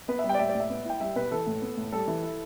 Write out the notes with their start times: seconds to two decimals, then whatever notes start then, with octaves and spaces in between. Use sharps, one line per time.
0.08 B3 B4
0.19 E5
0.24 G3
0.29 G5
0.34 D5
0.39 A2 E5
0.49 D5
0.55 A2
0.60 E5
0.70 B3
0.85 E4 G5
1.00 G3 E5
1.16 B2 B4
1.31 E3 A4
1.47 A2
1.62 B3
1.77 A2
1.92 G3 A4
2.07 E3
2.23 E4